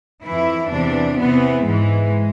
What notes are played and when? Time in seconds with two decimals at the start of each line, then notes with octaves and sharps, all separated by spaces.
0.23 F2 E3 E4
0.70 E2 C3 E3 D4
1.17 E2 C3 E3 B3
1.65 G#2 E3 G#3